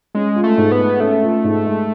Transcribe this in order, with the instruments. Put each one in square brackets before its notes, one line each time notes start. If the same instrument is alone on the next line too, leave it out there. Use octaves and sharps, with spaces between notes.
[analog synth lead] G#3 [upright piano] C#4
[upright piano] F4
[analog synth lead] A3
[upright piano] G#2
[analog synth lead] B3
[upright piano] G#3
[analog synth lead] A3 [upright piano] C#4
[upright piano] F4
G#2
G#3